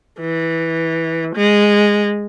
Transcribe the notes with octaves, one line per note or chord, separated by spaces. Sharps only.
E3
G#3